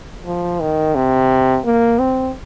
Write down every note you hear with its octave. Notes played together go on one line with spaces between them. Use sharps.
F3
D#3
C3
A#3
C4